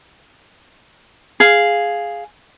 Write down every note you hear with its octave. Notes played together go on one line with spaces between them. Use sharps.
G#4 F5